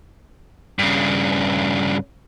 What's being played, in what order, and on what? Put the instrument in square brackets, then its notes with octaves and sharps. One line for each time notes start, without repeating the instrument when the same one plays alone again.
[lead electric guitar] G2 C#3